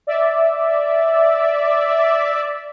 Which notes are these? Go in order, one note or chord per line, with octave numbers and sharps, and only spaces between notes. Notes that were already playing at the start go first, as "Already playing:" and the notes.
D5 E5